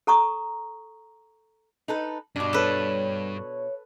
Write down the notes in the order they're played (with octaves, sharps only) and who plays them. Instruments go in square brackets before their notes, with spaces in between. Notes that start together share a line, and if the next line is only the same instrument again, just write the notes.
[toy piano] A4 A#5 C#6 D#6
[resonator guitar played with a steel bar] D#4 A4 B4
[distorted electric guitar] G2 [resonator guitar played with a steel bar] B2 D4
[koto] A4 B4 [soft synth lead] C#5